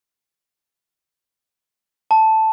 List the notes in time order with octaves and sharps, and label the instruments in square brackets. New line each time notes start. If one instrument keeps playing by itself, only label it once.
[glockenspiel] A5